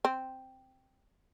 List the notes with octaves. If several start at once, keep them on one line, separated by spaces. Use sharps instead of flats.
C4